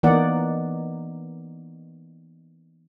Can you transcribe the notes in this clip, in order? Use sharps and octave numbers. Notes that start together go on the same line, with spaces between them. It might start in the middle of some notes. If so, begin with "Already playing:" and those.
E3 A#3 B3 D#4 D5 F#5